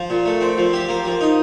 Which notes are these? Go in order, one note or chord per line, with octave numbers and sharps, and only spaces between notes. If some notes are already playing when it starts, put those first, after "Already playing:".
Already playing: F3
A#2
A3
C4
F3
G4
A#3
F3
D#4